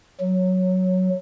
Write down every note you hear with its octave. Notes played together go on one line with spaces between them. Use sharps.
F#3